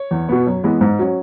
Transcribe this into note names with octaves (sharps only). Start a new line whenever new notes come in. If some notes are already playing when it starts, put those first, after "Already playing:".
Already playing: C#5
E2
B2 B3
F#2
E3 G#3 B3
G#2
F#3 C#4